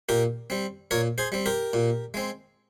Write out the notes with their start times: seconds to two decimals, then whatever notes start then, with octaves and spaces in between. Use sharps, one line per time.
0.09 A#2 G4 A#4
0.50 G3 C4
0.91 A#2 A#4 C#5
1.18 G#4 C5
1.32 G3 C4
1.46 G4 A#4
1.73 A#2
2.14 G#3 C4